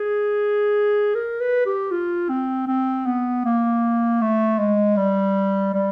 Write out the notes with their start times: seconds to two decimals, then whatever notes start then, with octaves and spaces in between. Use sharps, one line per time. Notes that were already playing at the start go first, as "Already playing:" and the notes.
Already playing: G#4
1.15 A#4
1.41 B4
1.66 G4
1.91 F4
2.30 C4
2.68 C4
3.06 B3
3.45 A#3
4.21 A3
4.59 G#3
4.97 G3
5.74 G3